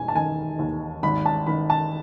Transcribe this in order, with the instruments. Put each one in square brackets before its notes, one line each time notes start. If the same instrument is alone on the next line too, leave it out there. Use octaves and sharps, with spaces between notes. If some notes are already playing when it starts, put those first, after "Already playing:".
Already playing: [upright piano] E1 D#2 G#5
A5
D#3 G#5
D#2
G#1 B5
A5
D#3 B5
A5